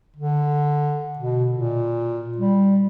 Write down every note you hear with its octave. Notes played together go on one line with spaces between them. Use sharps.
D3
B2
A#2
G3